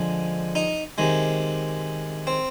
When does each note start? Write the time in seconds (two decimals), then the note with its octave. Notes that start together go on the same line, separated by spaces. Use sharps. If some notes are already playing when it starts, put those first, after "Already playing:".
Already playing: D3 F3 G#3
0.55 D#4
0.98 C3 D#3 G#3
2.27 C4